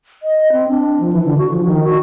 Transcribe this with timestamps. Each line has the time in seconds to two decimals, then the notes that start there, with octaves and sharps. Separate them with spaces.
0.23 D#5
0.52 C4
0.69 D4
1.00 F3
1.13 E3
1.25 D3
1.38 F#4
1.52 F3
1.66 D#3
1.84 F#4